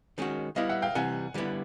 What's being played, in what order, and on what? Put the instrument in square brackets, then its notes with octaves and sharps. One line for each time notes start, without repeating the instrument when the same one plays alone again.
[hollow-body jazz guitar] D#3 G#3 C#4 F#4
[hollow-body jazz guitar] G3 B3 E4 [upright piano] D#5 F5
[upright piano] E5 F#5
F5 G5
[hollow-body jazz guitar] C3 E3 G3 [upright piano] F#5 G#5
[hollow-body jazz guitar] D3 G3 B3 E4